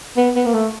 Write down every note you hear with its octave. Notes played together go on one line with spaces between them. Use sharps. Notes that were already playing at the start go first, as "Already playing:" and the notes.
B3
B3
A#3
A3